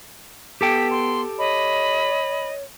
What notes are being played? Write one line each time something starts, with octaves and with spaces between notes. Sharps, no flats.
B3 G4 A4 G5 B6
C6
C#5 D#5 B5